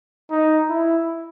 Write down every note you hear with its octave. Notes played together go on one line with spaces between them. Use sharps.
D#4
E4